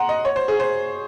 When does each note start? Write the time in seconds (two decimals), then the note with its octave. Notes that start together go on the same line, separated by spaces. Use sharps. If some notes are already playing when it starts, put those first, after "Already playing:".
Already playing: F#5 A#5 C6
0.09 D#5
0.25 C#5
0.36 C5
0.48 G#4
0.60 C5